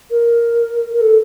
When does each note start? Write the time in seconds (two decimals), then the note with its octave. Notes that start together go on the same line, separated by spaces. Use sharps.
0.11 A#4
0.94 A#4
1.01 A4